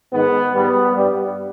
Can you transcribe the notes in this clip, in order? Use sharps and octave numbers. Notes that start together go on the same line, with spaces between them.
G#2 D#3 G#3 B3
G#2 G3 B3
G2 G3